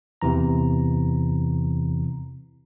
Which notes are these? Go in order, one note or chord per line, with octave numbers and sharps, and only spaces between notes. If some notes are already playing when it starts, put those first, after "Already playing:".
E2 C3 E3 A#5